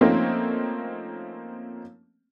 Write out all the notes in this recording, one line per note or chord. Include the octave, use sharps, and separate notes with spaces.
F3 A3 A#3 C4 C#4 D#4